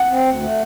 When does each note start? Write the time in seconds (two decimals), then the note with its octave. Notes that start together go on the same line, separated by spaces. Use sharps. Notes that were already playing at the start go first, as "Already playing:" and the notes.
Already playing: F#5
0.10 C4
0.26 D2
0.42 A3